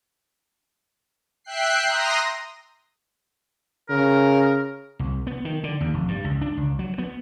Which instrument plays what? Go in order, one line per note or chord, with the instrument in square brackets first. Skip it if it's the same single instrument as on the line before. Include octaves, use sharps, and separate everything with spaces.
[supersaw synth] E5 G5 F#6 C7
A#5 C6 D#6 A#6
[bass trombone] C#3 [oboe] A#4
[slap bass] C2
B3
D#3
D3
D#2
F1
G2
C#2
D4
C#2
F#3
B3